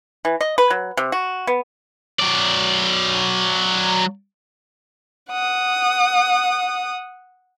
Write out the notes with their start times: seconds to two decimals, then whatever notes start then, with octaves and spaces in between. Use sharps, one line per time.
0.25 E3
0.41 D#5
0.58 B4
0.70 F#3
0.97 C3
1.12 F#4
1.47 B3
2.20 F#3 D5
5.30 F#5 D#6